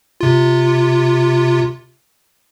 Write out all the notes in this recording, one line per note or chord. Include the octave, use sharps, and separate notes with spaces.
C3 F4